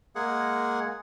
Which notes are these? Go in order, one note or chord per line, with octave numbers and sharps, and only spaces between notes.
G#3 A#3 G#4 F#5